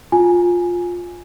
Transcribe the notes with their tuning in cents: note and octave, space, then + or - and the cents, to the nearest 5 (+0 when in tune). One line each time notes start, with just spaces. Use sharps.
F4 +10 G#5 +0